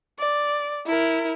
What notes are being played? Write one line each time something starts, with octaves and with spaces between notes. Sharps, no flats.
D5
E4 A#4